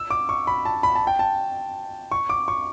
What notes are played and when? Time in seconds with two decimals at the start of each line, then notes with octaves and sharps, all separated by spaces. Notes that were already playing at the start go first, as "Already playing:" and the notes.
Already playing: E6
0.10 D6
0.29 C#6
0.47 B5
0.65 A5
0.83 B5
0.95 A5
1.07 G5
1.19 A5
2.11 C#6
2.29 D6
2.48 C#6